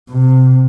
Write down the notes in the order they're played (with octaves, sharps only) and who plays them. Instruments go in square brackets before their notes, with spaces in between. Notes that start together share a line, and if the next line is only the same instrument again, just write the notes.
[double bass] C3